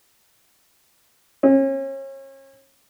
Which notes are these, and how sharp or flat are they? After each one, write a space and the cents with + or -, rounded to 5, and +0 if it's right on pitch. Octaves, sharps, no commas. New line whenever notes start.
C#4 -35